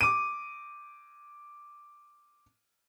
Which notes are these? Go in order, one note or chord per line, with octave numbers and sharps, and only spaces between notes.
D6 D#7